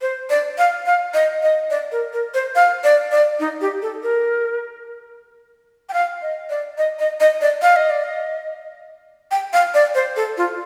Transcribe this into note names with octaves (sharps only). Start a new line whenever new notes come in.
C5
D5
F5
F5
D#5
D#5
D5
A#4
A#4
C5
F5
D5
D5
D#4
G4
A4
A#4
G5
F5
D#5
D5
D#5
D#5
D#5
D5
F5
D#5
D5
D#5
G5
F5
D5
C5
A4
F4